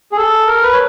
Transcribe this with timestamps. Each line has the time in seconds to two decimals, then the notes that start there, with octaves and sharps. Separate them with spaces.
0.12 G#4
0.16 A4
0.47 A#4
0.63 B4
0.73 C#5